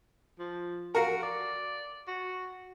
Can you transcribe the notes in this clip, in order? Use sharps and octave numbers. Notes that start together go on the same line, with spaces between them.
F3
F#4 A#4 F5
D5
F#4